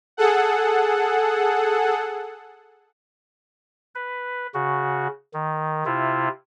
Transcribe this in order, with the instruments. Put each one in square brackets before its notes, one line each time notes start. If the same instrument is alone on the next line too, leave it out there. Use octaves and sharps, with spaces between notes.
[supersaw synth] G#4 A4 F#5
[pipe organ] B4
C#3 F#4
D#3
C3 E4 F4